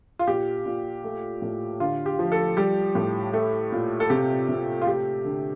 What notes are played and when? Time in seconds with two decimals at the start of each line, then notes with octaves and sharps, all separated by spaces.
0.19 F4
0.27 A#2 G4
0.66 A#2
1.04 A3
1.42 A2
1.80 D3 F4
2.06 G4
2.19 F3
2.32 A4
2.57 G3 G4
2.95 A2
3.33 A3
3.72 A#2
4.00 A4
4.10 C3 G4
4.49 C3
4.82 F4
4.87 A3 G4
5.25 D3